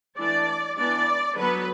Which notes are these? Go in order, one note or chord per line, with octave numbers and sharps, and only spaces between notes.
E3 A3 D4 D5
E3 B3 D4 D5
D3 F#3 B3 B4